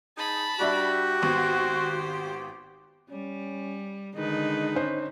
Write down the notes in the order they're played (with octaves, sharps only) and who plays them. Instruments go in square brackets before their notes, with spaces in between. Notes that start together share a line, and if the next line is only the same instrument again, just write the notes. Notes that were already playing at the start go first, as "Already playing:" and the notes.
[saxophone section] D#4 G#4 [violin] A5 B5
[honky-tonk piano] G3 D4 E5 [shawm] F#4 [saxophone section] G4
[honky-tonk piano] G#1 B3 C#6 [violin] C5
[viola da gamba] G3 [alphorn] C#4
[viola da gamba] D3 D#3 B4 [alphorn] G#3 [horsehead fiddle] D#4
[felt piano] C#4 C5